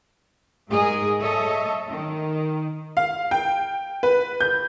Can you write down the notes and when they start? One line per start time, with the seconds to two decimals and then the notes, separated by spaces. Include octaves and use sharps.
0.70 G#2 G#4 A#4 D#5
1.19 A4 C#5 D#5 E5
1.89 D#3
2.97 F5
3.31 G5
4.03 B4
4.41 G6